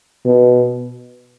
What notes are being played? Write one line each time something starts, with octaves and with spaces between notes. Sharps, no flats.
B2